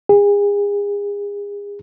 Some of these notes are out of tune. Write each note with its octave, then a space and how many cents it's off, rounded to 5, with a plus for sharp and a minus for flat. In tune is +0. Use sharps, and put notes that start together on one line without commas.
G#4 -35